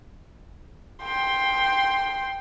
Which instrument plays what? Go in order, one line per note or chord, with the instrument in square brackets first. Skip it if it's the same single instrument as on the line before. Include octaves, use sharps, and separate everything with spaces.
[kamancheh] G5 C6